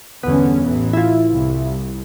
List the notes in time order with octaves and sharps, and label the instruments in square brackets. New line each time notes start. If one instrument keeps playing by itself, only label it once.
[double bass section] G1 D3 C#4 [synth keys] E2 B3
[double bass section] A1 E3
[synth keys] E4 F4
[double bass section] C2